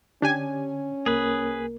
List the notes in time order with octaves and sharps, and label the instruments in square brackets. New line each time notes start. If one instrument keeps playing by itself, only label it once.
[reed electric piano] D3 [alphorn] C#4 [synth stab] D4 G4 G#5
[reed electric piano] C2 A#3 A#4 [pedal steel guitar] G#4 B4